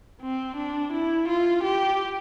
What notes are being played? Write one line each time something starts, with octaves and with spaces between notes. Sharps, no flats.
C4
D4
E4
F4
G4